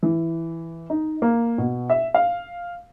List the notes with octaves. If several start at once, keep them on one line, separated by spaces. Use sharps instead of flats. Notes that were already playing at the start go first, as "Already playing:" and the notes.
E3
D#4
A#3
B2
E5
F5